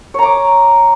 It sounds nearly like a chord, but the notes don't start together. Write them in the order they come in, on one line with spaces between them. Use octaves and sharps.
C#5 A#5 D6